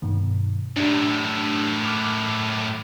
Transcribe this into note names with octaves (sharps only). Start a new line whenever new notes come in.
G2 B2 D#3
F#2 A2 D4 G4
D6 F6 F#6